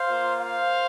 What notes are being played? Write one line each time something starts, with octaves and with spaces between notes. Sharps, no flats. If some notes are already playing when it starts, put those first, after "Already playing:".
Already playing: C5 F5
A#3 F4
C5 F5